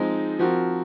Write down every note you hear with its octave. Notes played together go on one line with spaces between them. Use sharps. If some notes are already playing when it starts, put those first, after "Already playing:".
Already playing: F3 G#3 C4 D#4
F3 C4 F#4 A#4